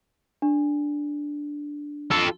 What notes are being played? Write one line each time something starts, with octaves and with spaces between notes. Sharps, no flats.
D4
F4 A4